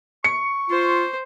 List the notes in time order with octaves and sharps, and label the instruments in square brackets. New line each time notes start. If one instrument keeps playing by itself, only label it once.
[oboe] C#6 [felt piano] C#7
[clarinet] F4 [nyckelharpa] C5